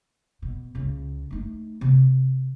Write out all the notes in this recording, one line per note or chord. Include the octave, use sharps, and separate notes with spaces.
B2
C#2 C#3
A3 D#4
C3